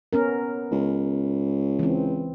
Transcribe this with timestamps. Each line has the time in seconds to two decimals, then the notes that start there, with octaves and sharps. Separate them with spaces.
0.13 B3 C#4 A#4
0.72 C#2
1.79 E3 C4